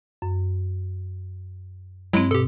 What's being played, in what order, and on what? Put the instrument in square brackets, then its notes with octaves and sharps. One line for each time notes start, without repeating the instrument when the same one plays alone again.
[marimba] F#2
[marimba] G2 C4 [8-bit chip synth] F#3 G#3 E4
[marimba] B2 [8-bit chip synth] G4 A4